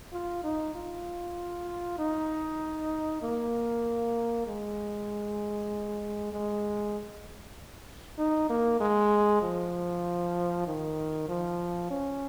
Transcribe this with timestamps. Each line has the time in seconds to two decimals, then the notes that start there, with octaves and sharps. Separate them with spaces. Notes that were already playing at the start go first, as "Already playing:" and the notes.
0.12 F4
0.43 D#4
0.75 F4
1.99 D#4
3.22 A#3
4.47 G#3
6.32 G#3
8.18 D#4
8.50 A#3
8.80 G#3
9.42 F3
10.67 D#3
11.28 F3
11.90 C#4